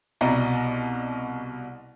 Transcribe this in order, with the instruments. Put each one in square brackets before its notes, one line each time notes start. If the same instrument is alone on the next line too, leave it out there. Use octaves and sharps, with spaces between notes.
[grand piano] C2 B2 D5 D#5 A#5